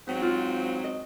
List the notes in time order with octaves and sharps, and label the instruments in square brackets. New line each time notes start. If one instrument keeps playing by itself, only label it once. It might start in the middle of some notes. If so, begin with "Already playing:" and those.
[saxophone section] G#2 F#3 C4
[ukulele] F4
D#5